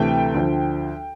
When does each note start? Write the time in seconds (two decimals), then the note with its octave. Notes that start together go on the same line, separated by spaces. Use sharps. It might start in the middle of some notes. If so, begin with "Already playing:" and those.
Already playing: D2 C3 E3 A3 G5
0.34 D2 D3 F3